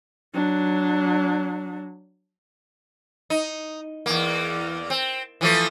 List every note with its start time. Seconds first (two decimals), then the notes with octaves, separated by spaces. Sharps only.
0.34 F#3 D4
3.30 D#4
4.06 E2 A#3
4.90 C4
5.41 E3 F3 A3